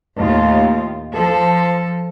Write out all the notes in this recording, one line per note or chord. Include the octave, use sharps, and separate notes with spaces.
D#2 A2 F4
F3 A4